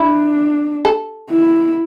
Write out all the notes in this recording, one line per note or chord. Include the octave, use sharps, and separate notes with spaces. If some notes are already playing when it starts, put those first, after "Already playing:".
Already playing: D4 E4
A4
E4